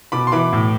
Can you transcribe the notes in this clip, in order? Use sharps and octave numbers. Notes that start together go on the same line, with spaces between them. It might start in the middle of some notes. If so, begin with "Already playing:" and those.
B2 B5 D6
C6
E3 B5 D6
A2